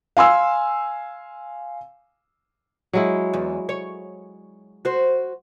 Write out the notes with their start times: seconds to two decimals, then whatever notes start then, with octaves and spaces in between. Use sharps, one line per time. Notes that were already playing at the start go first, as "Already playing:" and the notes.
0.17 F5 G#5 C6 E6
2.93 F#3 G#3 E4
3.33 E2
3.69 C#5
4.85 F#4 C5